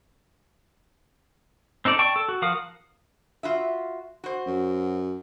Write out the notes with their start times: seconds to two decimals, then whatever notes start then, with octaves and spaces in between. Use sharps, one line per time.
1.85 C4 D#4 A4 D5
1.99 D5 G5 A5 C#6
2.16 A4
2.29 F#4
2.42 F3 F#4 A#4 F5 D#6
3.43 F4 F#4 E5
4.24 F#4 C5
4.46 F#2